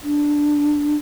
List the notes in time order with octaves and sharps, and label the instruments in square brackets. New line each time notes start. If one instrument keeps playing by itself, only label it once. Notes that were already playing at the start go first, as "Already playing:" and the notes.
[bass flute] D4